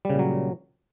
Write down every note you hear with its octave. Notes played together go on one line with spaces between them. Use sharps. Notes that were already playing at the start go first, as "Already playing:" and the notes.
A#2 C#3 F#3 G3